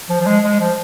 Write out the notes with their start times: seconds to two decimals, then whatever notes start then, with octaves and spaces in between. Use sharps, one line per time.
0.10 F3
0.21 F3
0.26 G#3
0.44 G#3
0.60 F3